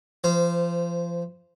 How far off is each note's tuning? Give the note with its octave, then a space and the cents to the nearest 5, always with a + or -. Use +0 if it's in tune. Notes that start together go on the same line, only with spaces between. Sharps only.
F3 -30 C5 -10